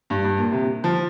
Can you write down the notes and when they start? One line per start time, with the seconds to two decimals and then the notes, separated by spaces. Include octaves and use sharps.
0.10 G2
0.24 G2
0.38 A#2
0.52 C3
0.84 F3